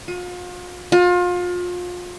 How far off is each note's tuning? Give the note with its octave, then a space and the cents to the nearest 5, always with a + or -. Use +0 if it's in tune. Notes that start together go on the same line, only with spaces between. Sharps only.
F4 +40
F4 +30